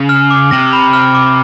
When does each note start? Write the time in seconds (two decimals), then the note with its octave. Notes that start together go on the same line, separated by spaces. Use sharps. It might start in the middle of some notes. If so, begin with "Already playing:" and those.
Already playing: C#3
0.09 F6
0.30 D6
0.51 C3 A#6
0.73 B5
0.93 F6
1.15 D6